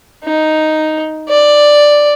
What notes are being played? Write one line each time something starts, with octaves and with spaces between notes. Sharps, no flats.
D#4
D5